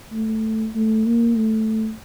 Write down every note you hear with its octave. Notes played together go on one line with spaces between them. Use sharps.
A3
A3
A#3
A3